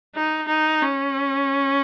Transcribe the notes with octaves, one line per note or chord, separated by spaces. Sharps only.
D#4
D#4
C#4